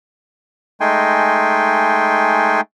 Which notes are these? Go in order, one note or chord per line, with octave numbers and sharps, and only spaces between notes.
G#3 A3 D#4 G5 G#5 C6